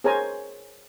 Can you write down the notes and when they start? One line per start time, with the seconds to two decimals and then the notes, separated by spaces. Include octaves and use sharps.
0.04 G#4 A#4 C5 C#5 G#5 A#5